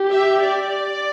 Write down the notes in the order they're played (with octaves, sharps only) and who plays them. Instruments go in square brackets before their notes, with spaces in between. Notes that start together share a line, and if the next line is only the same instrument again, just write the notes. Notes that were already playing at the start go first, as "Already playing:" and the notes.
Already playing: [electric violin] G4
[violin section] E5
D5